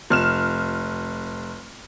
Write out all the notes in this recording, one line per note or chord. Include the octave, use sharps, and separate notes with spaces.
F1 F6 E7